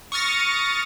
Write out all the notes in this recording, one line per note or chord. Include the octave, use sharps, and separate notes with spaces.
C#6 D#6 F6 A6 A#6